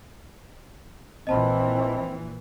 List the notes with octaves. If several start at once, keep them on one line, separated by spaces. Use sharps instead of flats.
A#1 A#2 E3 C4 D#5 A5 B5